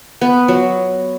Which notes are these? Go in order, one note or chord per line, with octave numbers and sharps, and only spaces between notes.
B3
F#3